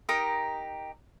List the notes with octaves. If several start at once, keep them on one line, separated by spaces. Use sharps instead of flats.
D#4 G4 A#4 D#6